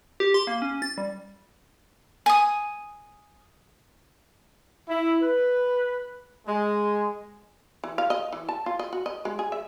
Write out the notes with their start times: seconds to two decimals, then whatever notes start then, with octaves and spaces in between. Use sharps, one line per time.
0.20 G4
0.34 C6
0.47 A#3
0.62 C#4
0.82 A6
0.98 G3
2.26 G#5 D#6
4.89 E4
5.22 B4
6.47 G#3
7.84 E3
7.98 F5
8.10 D#5
8.32 E3
8.49 A5
8.66 F4
8.79 D#5
8.93 F#4
9.06 D#5
9.25 G#3
9.39 G#4
9.52 E5